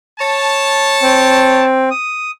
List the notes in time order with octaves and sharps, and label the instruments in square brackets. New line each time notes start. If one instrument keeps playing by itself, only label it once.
[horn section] C#5 A5
[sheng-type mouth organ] C4
D#6